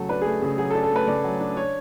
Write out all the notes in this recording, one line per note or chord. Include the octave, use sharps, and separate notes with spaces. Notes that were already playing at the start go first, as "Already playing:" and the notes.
Already playing: C#3 F#3 A3 A4
D4 B4
A3 G#4
C#3 G#4
F#3 G#4
A4
D4
A4
A3 B4
C#3 D5
F#3
D4
D4 C#5